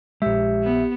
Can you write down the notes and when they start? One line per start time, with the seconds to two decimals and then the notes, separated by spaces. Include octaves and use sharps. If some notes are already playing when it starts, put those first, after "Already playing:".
0.22 A#1 G#3 G4 C#5 E5
0.63 B3